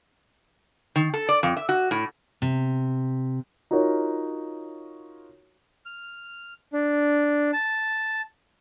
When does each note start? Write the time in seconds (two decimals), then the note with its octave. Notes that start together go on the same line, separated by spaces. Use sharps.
0.96 D#3
1.14 A4
1.29 D5
1.43 F2
1.57 E5
1.69 F#4
1.91 A2
2.42 C3
3.71 D#4 F4 F#4 A#4 C#5
5.86 F6
6.73 D4
7.53 A5